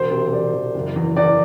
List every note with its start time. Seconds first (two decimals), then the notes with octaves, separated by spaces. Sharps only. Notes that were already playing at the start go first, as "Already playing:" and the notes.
Already playing: E1 C5
0.11 C3
0.27 C5
0.33 C3 D5
0.54 E1
0.74 F#1
0.96 E2
1.16 E2 D5